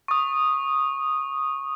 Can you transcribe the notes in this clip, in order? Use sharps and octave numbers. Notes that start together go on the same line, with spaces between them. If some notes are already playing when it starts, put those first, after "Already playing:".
C#6 D#6